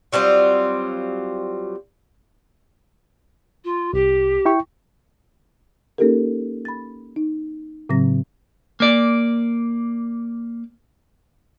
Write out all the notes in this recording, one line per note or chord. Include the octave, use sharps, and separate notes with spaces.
F#3 G3 C4 F4
F4
C2 G4
E4 G5 C#6
A#3 C#4 D#4 G4 A4 A#4
B5 A6
D#4
A2 C#3 F#3 C4 A#6
A#3 D5